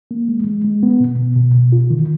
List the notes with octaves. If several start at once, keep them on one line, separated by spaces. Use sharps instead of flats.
A#3
G#3
G#3
G#3
B3
B2
B2
B2
B2
F4
D#3